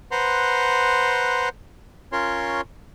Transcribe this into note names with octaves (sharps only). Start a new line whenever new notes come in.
B4 C5 F#5 A#5 C6
C#4 F4 A#4 C#5 C6